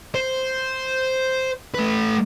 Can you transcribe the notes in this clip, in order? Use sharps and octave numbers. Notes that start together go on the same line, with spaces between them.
C5
A3 B4